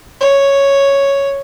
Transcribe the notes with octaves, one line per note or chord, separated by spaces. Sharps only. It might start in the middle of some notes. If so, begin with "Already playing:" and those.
C#5